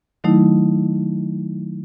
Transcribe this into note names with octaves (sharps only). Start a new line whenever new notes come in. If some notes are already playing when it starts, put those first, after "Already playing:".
D#3 F#3 A3 D#4 E4